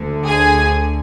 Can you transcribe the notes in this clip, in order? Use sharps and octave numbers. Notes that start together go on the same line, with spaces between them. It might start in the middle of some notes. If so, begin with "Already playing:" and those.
Already playing: D2 D3
G#4 G#5